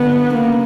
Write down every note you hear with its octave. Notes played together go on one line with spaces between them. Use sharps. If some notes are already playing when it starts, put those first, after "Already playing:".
Already playing: D3 B3
C#3 A#3